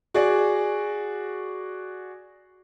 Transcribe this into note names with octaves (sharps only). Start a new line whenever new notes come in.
F#4 G#4 D5